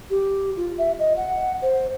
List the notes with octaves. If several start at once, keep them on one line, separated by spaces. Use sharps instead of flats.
G4
F4
E5
D#5
F#5
C5